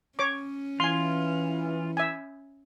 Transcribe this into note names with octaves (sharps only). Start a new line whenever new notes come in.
C#4 C#5 D6
E3 F4 G#5 C6
E5 G#5